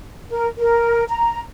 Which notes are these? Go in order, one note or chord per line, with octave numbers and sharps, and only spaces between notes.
A#4
A#4
A#5